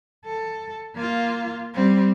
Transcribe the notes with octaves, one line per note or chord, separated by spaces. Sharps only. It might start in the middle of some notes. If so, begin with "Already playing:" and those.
A4
A#3 F4
G3 C4